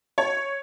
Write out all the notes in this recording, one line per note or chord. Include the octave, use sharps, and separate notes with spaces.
C#5